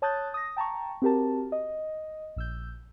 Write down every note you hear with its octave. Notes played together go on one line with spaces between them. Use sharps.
C#5 A5 D#6 F#6 G6 A6
D#6 A#6
G5 A5 A#5 C#6
C4 F#4 G4 A#4 A5
D#5
A#1 E6 G6